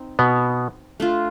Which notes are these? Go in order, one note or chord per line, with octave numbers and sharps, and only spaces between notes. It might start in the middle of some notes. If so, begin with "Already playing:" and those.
Already playing: C4 D#4
B2 B3
A3 D4 F4